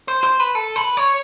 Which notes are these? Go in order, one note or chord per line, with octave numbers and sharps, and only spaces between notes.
C5
C5
B4
A4
B4
C#5